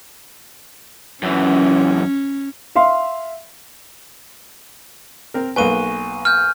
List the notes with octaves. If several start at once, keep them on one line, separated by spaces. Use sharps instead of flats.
F#2 E3 C#4
E5 F5 C6
C4 A#4
B1 A#3 B4 G#5 C#6 D#7
F6 G6